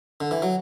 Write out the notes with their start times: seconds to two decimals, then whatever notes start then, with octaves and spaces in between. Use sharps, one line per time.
0.21 D3
0.31 E3
0.42 F#3